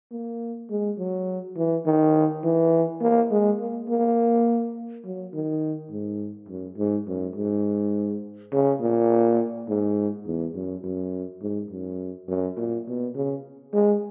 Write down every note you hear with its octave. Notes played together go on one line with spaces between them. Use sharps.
A#3
G#3
F#3
E3
D#3
E3
A#3
G#3
A#3
A#3
F#3
D#3
G#2
F#2
G#2
F#2
G#2
C#3
A#2
G#2
E2
F#2
F#2
G#2
F#2
F#2
A#2
B2
C#3
G#3